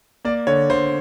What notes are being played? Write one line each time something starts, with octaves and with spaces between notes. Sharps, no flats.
A#3 D5
D3 C#5
D3 C5